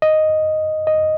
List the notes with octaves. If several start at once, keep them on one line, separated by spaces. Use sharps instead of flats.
D#5
D#5